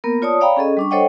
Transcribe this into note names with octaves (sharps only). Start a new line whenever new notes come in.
A#3 B3 A#4
F4 C#5 D5 A5 D#6
C#5 D5 F5 G5 A#5 B5
C#4 G#4 A4 D#5
G3 D4 C#6
A4 C5 C#5 D#5 F#5 G5